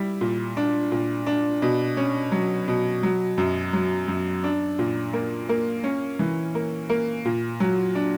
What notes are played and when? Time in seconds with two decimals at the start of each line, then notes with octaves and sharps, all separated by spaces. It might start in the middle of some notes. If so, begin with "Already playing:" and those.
Already playing: G3 E4
0.21 A#2
0.57 D4
0.92 A#2
1.27 D4
1.62 B2
1.97 C#4
2.32 F#3
2.68 B2
3.03 F#3
3.38 F#2
3.73 F#3
4.08 F#2
4.44 D4
4.79 A#2
5.13 A#3
5.49 A#3
5.84 C#4
6.19 E3
6.55 A#3
6.89 A#3
7.25 A#2
7.60 F#3
7.95 D4